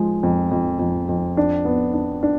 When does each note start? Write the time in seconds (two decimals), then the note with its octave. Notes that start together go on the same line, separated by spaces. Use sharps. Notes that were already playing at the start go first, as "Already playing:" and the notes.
Already playing: F3 G#3
0.23 F2
0.51 F2
0.79 F2
1.09 F2
1.37 D4
1.65 B3
1.94 D4
2.23 D4